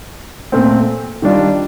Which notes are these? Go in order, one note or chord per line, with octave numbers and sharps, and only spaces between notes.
A#2 A3 C4
D#3 G3 D4 F4